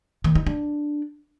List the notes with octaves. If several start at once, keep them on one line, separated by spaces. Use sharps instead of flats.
D#3
D#4
D4